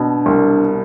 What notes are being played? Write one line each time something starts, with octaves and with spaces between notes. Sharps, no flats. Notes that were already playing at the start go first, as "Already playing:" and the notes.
Already playing: B2 D4
C2